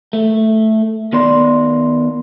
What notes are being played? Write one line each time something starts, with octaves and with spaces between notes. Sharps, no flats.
A3
D#3 B3 D5 C6